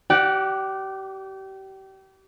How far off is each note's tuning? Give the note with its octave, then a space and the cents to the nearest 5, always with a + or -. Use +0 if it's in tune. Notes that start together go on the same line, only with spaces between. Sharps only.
G4 -30 D5 +0 F#5 +0